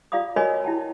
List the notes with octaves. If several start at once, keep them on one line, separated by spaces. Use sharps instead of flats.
F4 D5 F5 B5 D#6
F#4 A#4 C#5 D#5 G#5 B5
E4 G5 A5